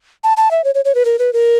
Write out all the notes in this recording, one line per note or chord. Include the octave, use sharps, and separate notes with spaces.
A5
A5
E5
C#5
C#5
C#5
B4
A#4
B4
A#4